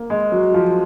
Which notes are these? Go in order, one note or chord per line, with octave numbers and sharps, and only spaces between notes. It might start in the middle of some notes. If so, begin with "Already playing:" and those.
Already playing: A#3
G#3
F#3
F3